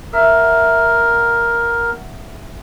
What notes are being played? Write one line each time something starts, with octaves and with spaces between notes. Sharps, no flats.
A#4 E5 F#5